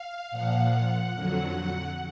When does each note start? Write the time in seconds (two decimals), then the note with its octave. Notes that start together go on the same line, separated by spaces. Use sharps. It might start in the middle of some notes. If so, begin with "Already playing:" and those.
Already playing: F5
0.31 A#2 F3 F#5
1.14 F2 D3 F#3